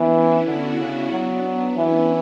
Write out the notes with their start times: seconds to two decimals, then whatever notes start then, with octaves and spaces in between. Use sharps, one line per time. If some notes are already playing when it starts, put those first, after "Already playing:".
Already playing: E3 B3 D4
0.13 C#4 E4
0.46 D3 D4 F#4
0.79 C#3 B3 D4
1.11 F#3
1.76 E3 C#4 E4